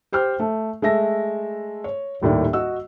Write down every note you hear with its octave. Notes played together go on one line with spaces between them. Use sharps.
G4 C5 G5 F6
A3
G#3 A3 E5 A#6
C#5
D#1 D#2 A2 D#3 D5
F#4 D#5 E6